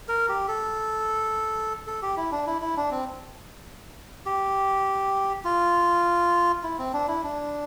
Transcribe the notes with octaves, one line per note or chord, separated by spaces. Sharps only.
A#4
G4
A4
A4
G4
E4
D4
E4
E4
D4
C4
G4
F4
E4
C4
D4
E4
D4